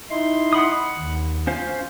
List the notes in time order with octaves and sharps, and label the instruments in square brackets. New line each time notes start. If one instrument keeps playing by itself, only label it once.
[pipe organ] D#4 E4 C6
[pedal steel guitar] F#5 B5 D#6
[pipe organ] D#2
[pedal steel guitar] C#4 C5 F5 [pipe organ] F4